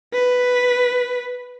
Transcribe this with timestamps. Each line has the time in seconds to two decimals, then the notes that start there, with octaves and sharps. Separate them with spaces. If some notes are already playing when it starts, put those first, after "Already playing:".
0.14 B4